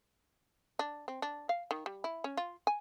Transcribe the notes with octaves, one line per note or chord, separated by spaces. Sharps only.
D4
C4
D4
F5
D#3
G3
E4
C#4
F4
G#5